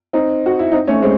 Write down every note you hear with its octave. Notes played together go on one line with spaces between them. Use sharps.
C4 D#4
F#4
E4
C4 D#4
A3 C#4
G#3 C4